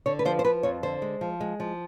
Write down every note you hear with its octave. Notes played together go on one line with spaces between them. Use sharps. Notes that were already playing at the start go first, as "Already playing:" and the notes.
D3 C#5
B4
F3 C5
C5
F3 B4
F2 C#5
D3 C5
G#3
F3
G#3
F3